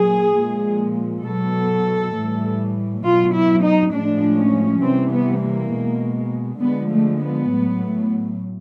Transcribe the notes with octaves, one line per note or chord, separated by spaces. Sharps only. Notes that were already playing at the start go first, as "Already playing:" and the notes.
Already playing: A#2 F#3 G#4
A#2 F3 G#3
B2 F#3 A4
A2 E3 G3
B2 F#3 F4
E4
D#4
A2 F3 G#3 D4
C#4
C3 E3 G3 C4
B3
A#3
B2 G#3
D3 F3 G#3 B3
A3
B3
A2 F#3